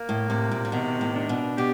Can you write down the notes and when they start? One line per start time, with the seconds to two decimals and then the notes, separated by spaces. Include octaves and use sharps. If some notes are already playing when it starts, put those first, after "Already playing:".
Already playing: A#3
0.09 A2
0.29 A2 C3
0.51 A#2
0.65 A#2
0.72 B2 D#3
1.01 A2
1.15 D4
1.29 B2
1.58 B2 G4